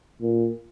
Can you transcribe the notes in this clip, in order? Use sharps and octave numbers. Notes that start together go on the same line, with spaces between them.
A#2